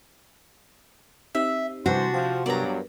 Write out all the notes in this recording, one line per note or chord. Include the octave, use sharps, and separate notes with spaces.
C4 D#4 G4 E5
C3 E3 G3 D4 F#4 B4 C5
F3 F#5 G5
G2 F#3 B3 A#4 B4 D5 A#5